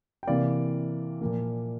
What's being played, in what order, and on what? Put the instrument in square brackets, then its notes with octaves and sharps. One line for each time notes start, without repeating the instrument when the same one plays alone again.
[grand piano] G5
C3 E3 A#3 D5 F5
A#2 F3 A#3